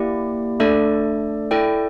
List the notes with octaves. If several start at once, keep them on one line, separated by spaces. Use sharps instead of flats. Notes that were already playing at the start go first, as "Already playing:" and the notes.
Already playing: A#3 E4 G4 D5
A3 D4 A4 D5
E4 A4 D5 G5